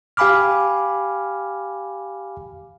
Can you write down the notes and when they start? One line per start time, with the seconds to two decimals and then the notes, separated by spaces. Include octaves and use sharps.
0.17 G4 F5 G#5 B5 D6 F6